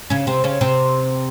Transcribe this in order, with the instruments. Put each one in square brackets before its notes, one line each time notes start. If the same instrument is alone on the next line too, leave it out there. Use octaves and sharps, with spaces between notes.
[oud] C#3 C#4
C3 C4
C#3 C#4
C3 C4